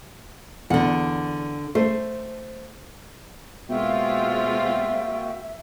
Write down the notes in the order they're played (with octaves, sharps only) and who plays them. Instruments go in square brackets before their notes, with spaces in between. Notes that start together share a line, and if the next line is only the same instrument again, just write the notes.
[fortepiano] E2 [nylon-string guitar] D3 F#5
[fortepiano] A3 [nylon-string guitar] C5
[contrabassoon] B2 [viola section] G#3 C4 F4 [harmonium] A#3 F#4 G5 [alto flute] E5